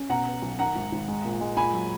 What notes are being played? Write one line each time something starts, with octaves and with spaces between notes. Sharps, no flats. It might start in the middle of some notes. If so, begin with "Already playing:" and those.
Already playing: C#4
B2 F#5 A#5
B3
B1
D#3 F#5 A#5
G#1
G#1
G#3
A#2
G#3
A#2 G#5 B5
F#3